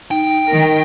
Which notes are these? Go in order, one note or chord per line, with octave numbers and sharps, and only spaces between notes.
D#4 G5
D#3 A#4